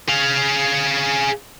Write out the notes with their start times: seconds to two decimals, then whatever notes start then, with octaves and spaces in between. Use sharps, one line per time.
0.09 G#4 F5